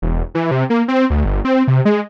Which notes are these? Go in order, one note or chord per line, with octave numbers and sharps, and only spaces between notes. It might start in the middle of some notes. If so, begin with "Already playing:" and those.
E1
E3
C3
A#3
C4
D2
G1
C4
C3
G#3